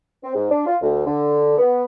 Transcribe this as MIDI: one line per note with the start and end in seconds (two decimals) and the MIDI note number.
0.24 0.35 60
0.35 0.47 44
0.50 0.65 62
0.66 0.75 65
0.82 1.05 38
1.06 1.58 50
1.58 1.84 59